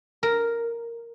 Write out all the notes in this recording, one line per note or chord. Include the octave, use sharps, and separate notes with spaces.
A#4